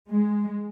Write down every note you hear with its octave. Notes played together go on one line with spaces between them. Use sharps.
G#3